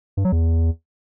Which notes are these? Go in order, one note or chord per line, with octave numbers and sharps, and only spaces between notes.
G2
F#3
E2